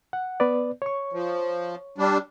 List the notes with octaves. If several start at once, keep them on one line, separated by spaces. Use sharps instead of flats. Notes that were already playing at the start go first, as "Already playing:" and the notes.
F#5
B3 B4 D5
C#5 C#6
F3
G3 D4